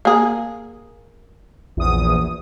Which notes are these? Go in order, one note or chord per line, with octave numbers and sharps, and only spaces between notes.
A#3 G#4
A#1 E2 D#6